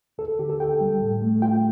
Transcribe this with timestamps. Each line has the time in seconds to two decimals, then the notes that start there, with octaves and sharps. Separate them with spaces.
0.18 D2 A4
0.39 D3 G4
0.50 A4
0.59 D2 G5
0.81 G3
1.01 A2
1.22 A3
1.42 F4 G5